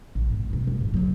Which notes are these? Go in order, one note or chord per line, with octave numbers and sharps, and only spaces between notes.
A#1
G#2
F2 B2
D1
G2 A#2
D3 F#3